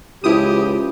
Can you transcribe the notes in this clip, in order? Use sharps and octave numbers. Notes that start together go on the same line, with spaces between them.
C#2 F3 E4 G4 B4 D#6